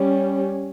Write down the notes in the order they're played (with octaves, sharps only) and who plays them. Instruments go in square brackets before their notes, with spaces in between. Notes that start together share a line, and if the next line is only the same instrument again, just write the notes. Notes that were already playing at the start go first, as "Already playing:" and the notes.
Already playing: [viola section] G3 C#4